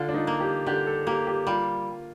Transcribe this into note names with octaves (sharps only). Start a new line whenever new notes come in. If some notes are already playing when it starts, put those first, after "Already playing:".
Already playing: D3 F4
D4
D#4
A#3
G4
D3 G4
A4
A#3 G4
G4
G3 F4